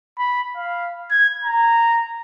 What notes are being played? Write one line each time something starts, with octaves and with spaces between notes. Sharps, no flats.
B5
F5
G#6
A#5